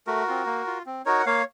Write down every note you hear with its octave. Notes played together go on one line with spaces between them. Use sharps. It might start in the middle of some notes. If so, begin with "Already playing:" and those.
A3 F#4 A#4
C4 F4
A#3
F4
C4
D#4 F#4 A#4 C#5
F#5
A#3 C#5 F5